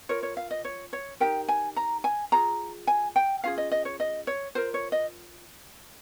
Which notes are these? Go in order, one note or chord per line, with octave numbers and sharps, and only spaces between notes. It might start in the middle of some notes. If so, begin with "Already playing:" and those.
F4 A#4 C#5
C#5
F5
D#5
C#5
C#5
D#4 G4 A#4 G5
G#5
A#5
G#5
F4 G#4 A#5
G#5
G5
C#4 F4 G#4 F5
D#5
D#5
C#5
D#5
C#5
F4 A#4 C5
C#5
D#5